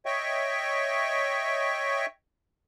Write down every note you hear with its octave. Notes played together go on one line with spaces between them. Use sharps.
C#5 D#5 E5 G5 C#6